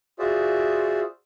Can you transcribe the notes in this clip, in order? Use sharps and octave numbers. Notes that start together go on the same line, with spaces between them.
F4 F#4 G#4 C5 D5 E5